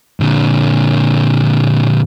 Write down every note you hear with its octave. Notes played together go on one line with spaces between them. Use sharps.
A#2 D3